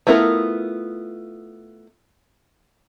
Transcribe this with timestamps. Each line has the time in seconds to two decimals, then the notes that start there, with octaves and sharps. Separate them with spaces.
0.07 A3 B3 E4 F4 A#4